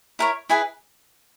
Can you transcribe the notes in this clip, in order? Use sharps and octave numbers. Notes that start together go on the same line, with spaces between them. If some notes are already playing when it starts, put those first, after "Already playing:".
E4 A#4 C#5
E4 G#4 B4 G#5